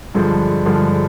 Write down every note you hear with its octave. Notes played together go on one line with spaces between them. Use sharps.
G2 D3 F3 G#3
G2 D3 F3 G#3